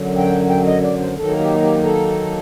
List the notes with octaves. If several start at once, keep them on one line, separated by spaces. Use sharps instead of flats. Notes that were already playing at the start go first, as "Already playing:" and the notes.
Already playing: F#2 D3 F#3
G5
G5
D#5
D5
C5
D#3 F#3 A#3 D#4 A4
G4
G4
A4